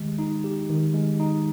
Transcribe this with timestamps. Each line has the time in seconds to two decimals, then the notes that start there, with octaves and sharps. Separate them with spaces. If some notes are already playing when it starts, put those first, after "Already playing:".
Already playing: D#3 G#3 G4
0.19 D#4
0.44 G4
0.69 D#3
0.94 G#3
1.20 D#4